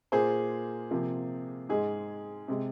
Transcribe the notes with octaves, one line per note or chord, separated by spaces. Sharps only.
A#2 A#3 G#4 C5
C3 F3 A#3
G#2 G#3 G#4
C3 G#3